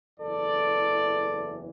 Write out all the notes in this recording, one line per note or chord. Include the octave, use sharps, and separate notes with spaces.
F#1 E2 E3 A4 D5